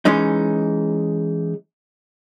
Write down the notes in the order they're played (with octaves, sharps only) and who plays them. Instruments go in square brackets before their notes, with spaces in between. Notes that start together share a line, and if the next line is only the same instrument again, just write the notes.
[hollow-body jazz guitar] E3 G#3 C#4 D#4